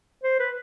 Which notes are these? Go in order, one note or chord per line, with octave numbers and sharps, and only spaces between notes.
C5
B4